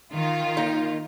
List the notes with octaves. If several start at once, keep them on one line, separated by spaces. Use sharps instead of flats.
D#3 F4
A#3 D#4